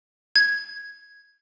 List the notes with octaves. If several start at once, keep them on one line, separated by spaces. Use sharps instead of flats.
G#6